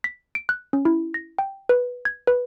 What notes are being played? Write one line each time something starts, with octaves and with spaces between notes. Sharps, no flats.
B6
D7
F#6
C#4
E4
A#6
G5
B4
G#6
B4